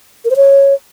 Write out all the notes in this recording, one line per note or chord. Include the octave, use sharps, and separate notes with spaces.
A#4
C5
C#5